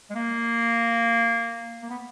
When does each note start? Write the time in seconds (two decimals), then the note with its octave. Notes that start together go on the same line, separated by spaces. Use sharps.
0.10 G#3
0.15 A#3
1.83 A#3
1.90 B3